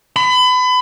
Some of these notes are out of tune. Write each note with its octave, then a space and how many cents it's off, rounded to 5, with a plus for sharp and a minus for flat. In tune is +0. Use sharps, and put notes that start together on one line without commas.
B5 +30